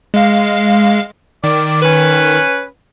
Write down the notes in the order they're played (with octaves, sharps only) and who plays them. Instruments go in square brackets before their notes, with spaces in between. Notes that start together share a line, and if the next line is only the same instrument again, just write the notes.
[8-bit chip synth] G#3 F5
[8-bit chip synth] D#3 [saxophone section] D5
[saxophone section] C#4 B4